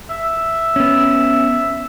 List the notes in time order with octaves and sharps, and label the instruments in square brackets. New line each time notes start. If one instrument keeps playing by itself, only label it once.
[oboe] E5
[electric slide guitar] B3 C#4